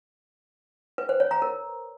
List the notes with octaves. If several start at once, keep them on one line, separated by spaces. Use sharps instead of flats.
B4
C5
C#5
A#5
A#4